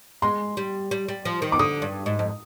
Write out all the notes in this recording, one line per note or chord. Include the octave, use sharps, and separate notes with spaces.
G#3 C6
G3
G3
G3
F3
D#3
D6
D3 D#6
G2
G#2
F2